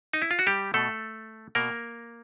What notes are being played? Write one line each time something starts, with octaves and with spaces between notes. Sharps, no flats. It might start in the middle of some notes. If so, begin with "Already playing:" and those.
D#4
E4
F4
F#4
G3 G4
B2 A3 A4
B2 A#3 A#4